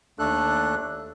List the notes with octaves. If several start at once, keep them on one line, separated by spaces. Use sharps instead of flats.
D#2 A3 D4 A4 F#6